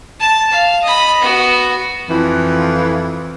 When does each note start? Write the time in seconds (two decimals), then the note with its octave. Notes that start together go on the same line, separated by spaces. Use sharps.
0.20 A5
0.51 F5
0.83 D#5 B5
1.21 B3 F#4
2.09 F2 E3